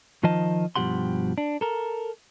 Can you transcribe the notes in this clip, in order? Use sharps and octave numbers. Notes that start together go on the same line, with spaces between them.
D#3 F3 F4 C5 D#5 A5
G2 B2 F3 G4 F#5 C6
D4
A4 A#4